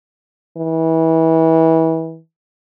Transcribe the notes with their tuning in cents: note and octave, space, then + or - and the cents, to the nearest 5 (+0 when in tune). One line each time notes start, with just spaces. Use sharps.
E3 -25